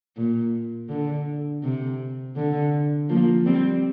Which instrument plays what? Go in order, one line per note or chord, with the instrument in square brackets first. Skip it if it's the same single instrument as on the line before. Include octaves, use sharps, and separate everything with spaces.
[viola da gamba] A#2
D3
C3
D3
F3 A#3
G3 C4